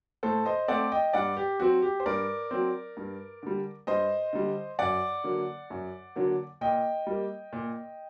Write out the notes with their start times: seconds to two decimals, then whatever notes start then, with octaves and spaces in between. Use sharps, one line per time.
0.23 A2 A4 C5
0.45 C5 D#5
0.68 A3 C4 D5 F#5
0.92 D#5 G5
1.13 G2 D5 F#5
1.37 G4
1.60 F#3 C4 F#4
1.82 G4
2.00 C5
2.06 G2 A#4 D5
2.51 F#3 C4
2.97 G2
3.43 D3 G3
3.87 G2 C5 D#5
4.33 D3 G3
4.79 F#2 D5 F#5
5.24 D3 F#3 A#3
5.70 F#2
6.16 D3 F#3 A#3
6.61 A#2 D#5 G5
7.07 G3 A#3
7.53 A#2